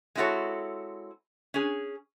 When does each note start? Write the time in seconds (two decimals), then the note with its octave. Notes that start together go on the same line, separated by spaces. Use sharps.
0.15 G#3 C4 E4 F#4 A4 C#5
1.54 C#4 G#4